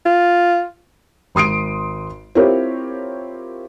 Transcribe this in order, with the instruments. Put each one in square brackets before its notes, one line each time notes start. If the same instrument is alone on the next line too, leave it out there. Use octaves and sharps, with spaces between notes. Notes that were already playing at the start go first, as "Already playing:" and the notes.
[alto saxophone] F4
[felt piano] G#1 C6 D#6 C7 D7
C4 E4 F4 G4 A#4 C#5